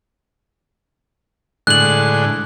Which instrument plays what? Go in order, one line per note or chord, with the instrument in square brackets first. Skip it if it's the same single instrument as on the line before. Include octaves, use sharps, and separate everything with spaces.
[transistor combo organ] A2 D3 G#3 [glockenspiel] F#6 F#7